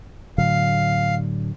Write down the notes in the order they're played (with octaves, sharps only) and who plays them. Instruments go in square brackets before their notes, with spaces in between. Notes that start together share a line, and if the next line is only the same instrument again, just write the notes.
[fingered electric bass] A2 D3 F#3 [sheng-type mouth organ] F5